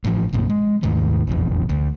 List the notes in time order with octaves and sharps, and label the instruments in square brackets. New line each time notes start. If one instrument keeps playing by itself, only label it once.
[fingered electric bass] A1 A2 F3
A#1 F#2 A#2
G#3
D#2 G#2 D#3 A3
F1 A#1 E2
D2